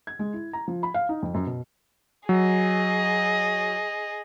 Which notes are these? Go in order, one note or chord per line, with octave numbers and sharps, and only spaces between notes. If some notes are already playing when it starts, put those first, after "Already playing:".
G#6
G#3
E4
A#5
F3
B5
F5
D#4
F2
F#2
B2
F#3 G#4 D#5